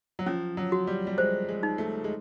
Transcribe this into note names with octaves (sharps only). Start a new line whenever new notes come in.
F#3
F3 C#4
F#3
F#4
G3
G3
G#3 C5
G#3
D#4
A3
G#3